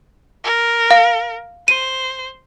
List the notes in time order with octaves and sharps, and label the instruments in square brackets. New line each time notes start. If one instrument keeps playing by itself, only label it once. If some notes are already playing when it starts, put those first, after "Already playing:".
[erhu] A#4
[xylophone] F5
[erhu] C5 [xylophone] D#7